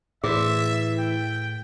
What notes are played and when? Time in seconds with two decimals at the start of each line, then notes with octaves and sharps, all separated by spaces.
0.24 A2 E3 G#4 C5 E5
0.98 G5